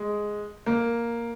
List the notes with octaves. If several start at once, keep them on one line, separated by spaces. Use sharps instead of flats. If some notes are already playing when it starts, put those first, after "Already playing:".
Already playing: G#3
A#3